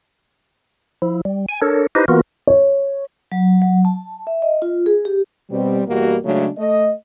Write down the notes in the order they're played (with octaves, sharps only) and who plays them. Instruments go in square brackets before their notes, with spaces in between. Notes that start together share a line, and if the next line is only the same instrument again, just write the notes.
[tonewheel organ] F3 E4
G3
G#5
D4 A4 A#4 C#5
D#4 E4 G4 B4 C5 D#5
E3 A#3 B3 F4 F#4 A#4
[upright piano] C#5
[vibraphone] F#3
F#3
A5
E5
D#5
F4
G#4
G4
[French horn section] B2 G3 C4
E2 B2 G3 A#3 F#4 G4
C#3 F#3 G#3 A3 C#4 D4
A3 D#5